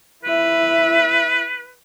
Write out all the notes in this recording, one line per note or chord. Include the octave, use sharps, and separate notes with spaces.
E4 B4 E5